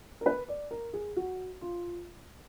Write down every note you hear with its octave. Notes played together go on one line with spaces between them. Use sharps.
A#4
B4
D5
A#4
G#4
F#4
F4